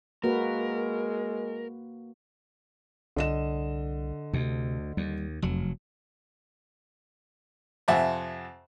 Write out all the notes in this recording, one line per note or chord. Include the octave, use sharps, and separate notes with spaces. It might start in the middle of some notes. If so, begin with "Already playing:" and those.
G#3 A#3 F#4 A#4 B4
C2 D3 D#5 E7
D2 C3
D#2 G3
F1 F2 F#3
F2 C3 E5 F#5 G#5